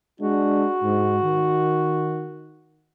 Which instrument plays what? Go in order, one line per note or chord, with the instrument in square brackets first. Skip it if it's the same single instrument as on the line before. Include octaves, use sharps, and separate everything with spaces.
[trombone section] G#3 D4 [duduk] F#4
[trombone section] G#2
D#3